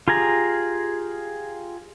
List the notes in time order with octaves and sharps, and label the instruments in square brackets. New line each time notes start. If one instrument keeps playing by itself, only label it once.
[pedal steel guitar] F4 G4 G#4 A#5